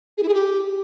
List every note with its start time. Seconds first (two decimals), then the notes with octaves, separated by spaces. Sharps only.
0.17 G#4
0.22 E4
0.28 G#4
0.33 G4